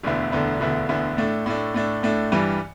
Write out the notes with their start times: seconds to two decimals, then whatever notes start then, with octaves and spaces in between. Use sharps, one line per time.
0.03 E1 D2 D3 B3 E4
0.32 E1 D2 D3 B3 E4
0.60 E1 D2 D3 B3 E4
0.89 E1 D2 D3 B3 E4
1.17 A2 A3 D4
1.46 A2 A3 D4
1.74 A2 A3 D4
2.03 A2 A3 D4
2.32 G2 E3 G3 D4